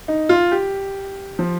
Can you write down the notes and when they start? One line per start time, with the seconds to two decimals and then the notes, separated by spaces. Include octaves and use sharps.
0.08 D#4
0.29 F4
0.52 G4
1.39 F3